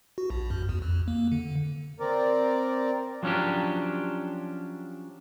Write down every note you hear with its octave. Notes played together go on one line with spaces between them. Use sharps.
F#4
A#1
F#2
E2
F2
A#3
D3
C4 A#4 D5
F3 F#3 C#4 D4 G4